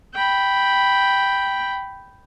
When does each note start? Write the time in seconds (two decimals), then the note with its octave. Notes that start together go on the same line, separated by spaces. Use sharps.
0.14 G5 B5